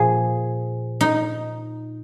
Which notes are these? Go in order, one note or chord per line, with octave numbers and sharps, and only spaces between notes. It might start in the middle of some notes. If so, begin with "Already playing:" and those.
Already playing: A#2 F3 G#4
D#4